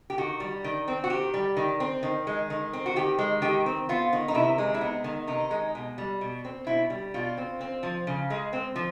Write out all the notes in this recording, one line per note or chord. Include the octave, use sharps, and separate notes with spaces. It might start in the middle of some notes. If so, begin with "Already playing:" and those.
G4
D#3 F#4
G3
D#3
C4
F#4
D#3 G4
G3
D#3
C4
D#3
G#3
D#3
C4
F#4
D#3 G4
G#3
D#3 G4
C4
B3 F4
D#3
D#4
C3 E4
G#3
E4
B3 D#4
D#3
C3 D#4
G#3
B2
G3
B2
C4
B2 E4
G3
B2 F4
C4
C4
F3
C#3
G#3
C4
F3